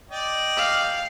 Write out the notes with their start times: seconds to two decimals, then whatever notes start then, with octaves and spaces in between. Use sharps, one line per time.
0.10 D5 D#5 G5
0.57 F5